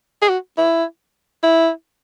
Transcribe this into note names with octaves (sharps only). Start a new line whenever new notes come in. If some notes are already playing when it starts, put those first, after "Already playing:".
G#4
F#4
E4
E4